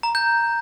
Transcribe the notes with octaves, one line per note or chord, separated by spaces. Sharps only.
A#5
G6